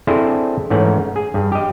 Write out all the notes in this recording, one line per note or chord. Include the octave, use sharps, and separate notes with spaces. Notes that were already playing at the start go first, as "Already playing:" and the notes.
C4 D4 E4 G#4 A4 C5
G#2 E3 A3 C#4 F#5
G#4
G2
G4 D#5